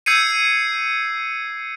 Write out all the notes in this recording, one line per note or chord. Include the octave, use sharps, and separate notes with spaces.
E6 G6 G#6 C7 C#7 D#7